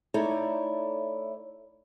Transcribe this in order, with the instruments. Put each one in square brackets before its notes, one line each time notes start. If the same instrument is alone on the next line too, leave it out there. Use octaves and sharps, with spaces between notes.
[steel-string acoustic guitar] A3 D#4 E4 A4 C#5 D5